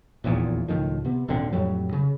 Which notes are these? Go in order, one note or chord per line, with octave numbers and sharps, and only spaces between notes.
D#1 A#1 E2 A#2
C#2 A2 D#3 F3
C3 B3
D#1 G#1 D3 C4
F2 A2 F#3 G3
C#3